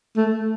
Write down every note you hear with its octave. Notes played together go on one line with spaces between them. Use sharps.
A3